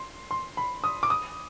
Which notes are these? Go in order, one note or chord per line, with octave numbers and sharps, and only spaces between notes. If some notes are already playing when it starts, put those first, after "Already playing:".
Already playing: C6
C6
B5
D#6
D6
D#6